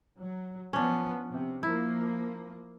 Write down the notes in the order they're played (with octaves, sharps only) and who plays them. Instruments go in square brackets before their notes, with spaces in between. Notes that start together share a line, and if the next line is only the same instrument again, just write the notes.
[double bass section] F#3
[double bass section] F3 B3 [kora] C#4 D4
[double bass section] C3
[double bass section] F3 A#3 [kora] E4